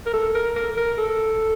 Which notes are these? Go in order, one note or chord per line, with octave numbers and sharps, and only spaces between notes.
A#4
A4
A#4
A#4
A#4
A4